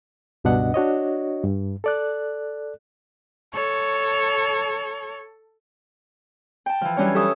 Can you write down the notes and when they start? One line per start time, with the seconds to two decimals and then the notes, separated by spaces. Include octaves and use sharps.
0.44 C#2 G2 B2 D4 D#5 F#5
0.74 D4 F#4 C#5 D#5
1.44 G2
1.84 A4 D5 F#6
3.54 A4 C#5
6.66 G5 A5
6.81 E3 F3
6.97 E3 F#3 G3 C#4 D4 C#5
7.15 G4 A4 E5 A5 C#6 D#6